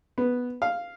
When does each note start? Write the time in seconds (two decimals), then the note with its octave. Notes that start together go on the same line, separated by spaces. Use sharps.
0.18 B3
0.62 F5